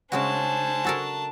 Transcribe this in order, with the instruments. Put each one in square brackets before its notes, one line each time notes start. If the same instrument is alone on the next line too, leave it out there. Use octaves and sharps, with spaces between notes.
[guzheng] C#3 G#3 F#4 [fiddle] D4 A5 [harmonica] C5 G#5
[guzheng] F#4 A4 A#4